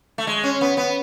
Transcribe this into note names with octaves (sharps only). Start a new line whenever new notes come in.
A3
G#3
C#4
B3
B3